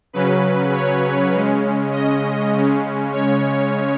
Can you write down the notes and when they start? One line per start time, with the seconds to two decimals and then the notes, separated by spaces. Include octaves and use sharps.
0.13 C#3 F#3 C#4 B4
0.73 C#5
1.33 C#3 G#3 C#4
1.93 D#5
2.54 C#3 G#3 C#4
3.13 C#5